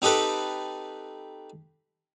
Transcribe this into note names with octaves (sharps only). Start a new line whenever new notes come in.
C4 D#4 G4 A4 B4